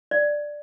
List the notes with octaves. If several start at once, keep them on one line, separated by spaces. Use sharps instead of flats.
D5